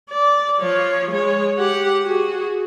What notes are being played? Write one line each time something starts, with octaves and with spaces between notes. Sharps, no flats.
D5
F3 C#5
G#3 C#5
G4 F#5
F#4 G#4